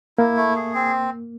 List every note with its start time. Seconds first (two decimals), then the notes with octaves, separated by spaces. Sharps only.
0.18 A#3 E4
0.37 A3
0.56 G#4
0.74 C4